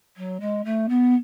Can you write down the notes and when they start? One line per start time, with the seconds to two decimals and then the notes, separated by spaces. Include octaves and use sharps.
0.16 F#3
0.40 G#3
0.64 A3
0.89 B3